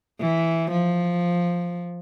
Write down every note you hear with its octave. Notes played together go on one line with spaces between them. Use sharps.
E3
F3